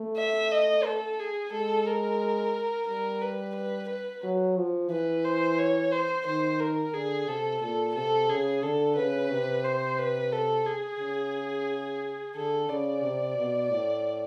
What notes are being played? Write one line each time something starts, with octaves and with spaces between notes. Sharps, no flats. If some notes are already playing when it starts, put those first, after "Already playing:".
Already playing: A3
E5
D#5
A4
G#4
G#3 A4
A#4
G3 A#4
B4
B4
B4
F#3
F3
E3 B4
C5
C#5
C5
D#3 C5
A#4
D3 G#4
C3 A4
A#2 A4
C3 A4
C#3 G#4
D3 A4
C#3 B4
C3
C5
B4
A4
G#4
C#3
D3 A4
C#3 D5
C3
B2
A2